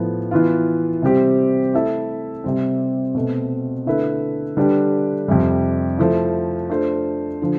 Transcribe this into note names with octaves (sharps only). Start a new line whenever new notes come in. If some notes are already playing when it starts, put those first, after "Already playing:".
Already playing: A2 F3 B3
E3 B3 F4
C3 G3 C4 G4
A3 E4 A4 E5
C3 G3 C4
B2 A3 C4
D3 A3 E4 B4 E5
D3 G3 D4 G4 B4
F2 C3 G3
F3 A3 E4
A3 D4 F4 A4 C5
D3 F3